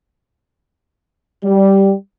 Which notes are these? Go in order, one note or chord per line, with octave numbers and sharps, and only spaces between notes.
G3